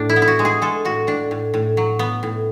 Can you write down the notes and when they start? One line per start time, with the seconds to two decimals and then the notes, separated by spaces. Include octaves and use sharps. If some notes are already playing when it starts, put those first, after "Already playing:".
Already playing: A2 D4
0.09 E4
0.16 B3
0.22 E4
0.28 F#4
0.39 G#3
0.45 G#4
0.62 G#3 A4
0.85 A2 F#4
1.07 A2 D4
1.31 A2
1.54 A2
1.77 F#3
1.99 B3
2.23 A2